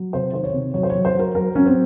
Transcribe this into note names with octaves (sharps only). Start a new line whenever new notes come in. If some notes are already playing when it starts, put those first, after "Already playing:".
Already playing: F#3
C3 C5
D#3 C5
C#5
C3
F#3 C#5
C5
F#3 C#5
C5
F#3 A#4
F#3 A#4
F#3 C#4
C4